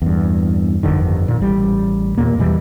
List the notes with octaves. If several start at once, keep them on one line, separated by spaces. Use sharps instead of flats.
E2 G2
G1 F2 D3 D#3
A#2
A1 G3
D#2 A#2 A#3
E2 B2 E3 G3